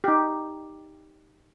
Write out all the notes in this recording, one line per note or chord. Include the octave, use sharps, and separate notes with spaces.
D#4 G4